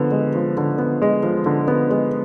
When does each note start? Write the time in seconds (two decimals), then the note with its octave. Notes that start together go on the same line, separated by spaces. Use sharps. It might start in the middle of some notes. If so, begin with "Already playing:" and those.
Already playing: D3 F3 B3
0.12 G#3
0.35 F3
0.57 D3
0.78 B3
1.02 G#3
1.23 F3
1.46 D3
1.68 B3
1.90 G#3